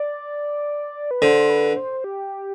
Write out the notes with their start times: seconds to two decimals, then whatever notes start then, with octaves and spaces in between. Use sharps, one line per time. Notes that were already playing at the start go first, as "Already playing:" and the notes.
Already playing: D5
1.11 B4
1.22 D3 C5
1.50 B4
1.77 C5
2.04 G4